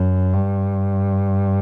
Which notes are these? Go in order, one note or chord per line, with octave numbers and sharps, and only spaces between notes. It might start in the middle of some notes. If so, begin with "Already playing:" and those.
Already playing: F#2
G2